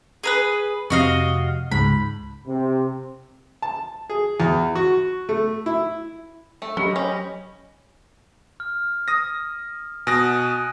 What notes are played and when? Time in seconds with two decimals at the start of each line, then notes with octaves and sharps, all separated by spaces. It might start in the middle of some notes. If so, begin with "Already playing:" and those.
0.24 G#4 A#4 B4
0.90 F2 C3 F#4 D#5 F5
1.71 C#2 G#2 B5
2.47 C3
3.62 A5
4.10 G#4
4.40 E2
4.75 F#4
5.29 A3
5.66 E4
6.62 A3
6.77 F#3 C#4 G4 D#5 B5
6.96 C#4 C#5
8.60 F6
9.08 D#6 A#6
10.07 B2 G#5 D#6 F#6 A#6
10.39 D#7